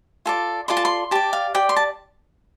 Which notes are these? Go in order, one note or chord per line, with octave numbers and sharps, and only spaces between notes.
F4 A4 D5
F4 A4 D5 C6
A5
C6
G4 D5 A5
F5
G4 D5 G5
C6
A5